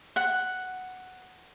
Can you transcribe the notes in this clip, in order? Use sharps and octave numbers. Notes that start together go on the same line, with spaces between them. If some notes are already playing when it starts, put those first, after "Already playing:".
F#5